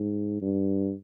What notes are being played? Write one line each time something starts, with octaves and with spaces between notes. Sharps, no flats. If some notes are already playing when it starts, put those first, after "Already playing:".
Already playing: G#2
G2